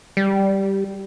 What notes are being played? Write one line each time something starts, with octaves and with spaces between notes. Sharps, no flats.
G3